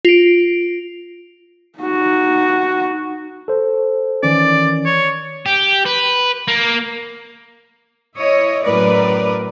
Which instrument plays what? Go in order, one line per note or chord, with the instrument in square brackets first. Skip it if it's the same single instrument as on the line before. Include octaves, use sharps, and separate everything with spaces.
[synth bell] F4 D7
[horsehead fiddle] D#4 F#4
[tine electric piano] A4 C5
[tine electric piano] D#3 E3 C#4 [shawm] D5
[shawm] C#5
[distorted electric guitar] G4
B4
A#3
[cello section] E4 C#5 D#5
F#2 A2 A#4 B4 D5